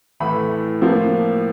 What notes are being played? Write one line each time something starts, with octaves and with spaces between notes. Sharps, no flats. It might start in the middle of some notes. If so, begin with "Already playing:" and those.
A2 E3 A3 B5
A2 F3 A#3